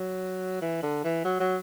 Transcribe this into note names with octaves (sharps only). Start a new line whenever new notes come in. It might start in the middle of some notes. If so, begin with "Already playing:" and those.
Already playing: F#3
E3
D3
E3
F#3
F#3